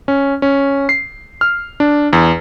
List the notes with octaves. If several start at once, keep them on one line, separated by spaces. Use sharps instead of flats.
C#4
C#4
C7
F6
D4
E2